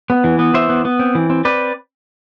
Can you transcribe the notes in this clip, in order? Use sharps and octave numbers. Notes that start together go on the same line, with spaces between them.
B3
E3
B3
E3 C5 E5
B3
B3
C4
E3
C4
C4 B4 D5